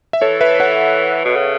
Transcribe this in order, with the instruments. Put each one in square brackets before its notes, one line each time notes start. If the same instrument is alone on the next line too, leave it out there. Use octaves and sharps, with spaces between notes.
[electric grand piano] E5
[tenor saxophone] E3 [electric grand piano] A4 C#5
[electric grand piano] B4 E5
C#5 F#5
[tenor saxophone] B2
C#3